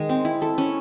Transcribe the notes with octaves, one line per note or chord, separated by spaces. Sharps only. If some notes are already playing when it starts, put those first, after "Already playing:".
Already playing: D#3 G#3
C4
E4
A4
C#4